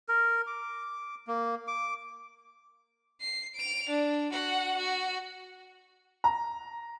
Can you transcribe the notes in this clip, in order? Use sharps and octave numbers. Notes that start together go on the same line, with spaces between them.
A#4
D6
A#3
D6
C7
D7 F7
D4
F#4 F#5
F#4
A#5